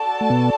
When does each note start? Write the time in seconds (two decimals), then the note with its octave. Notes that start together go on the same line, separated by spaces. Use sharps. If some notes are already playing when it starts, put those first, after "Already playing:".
Already playing: F#4 A4 D5 A5
0.21 A3
0.30 B2 B3